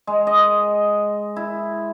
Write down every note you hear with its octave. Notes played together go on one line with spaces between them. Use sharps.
G#3
D#5
E4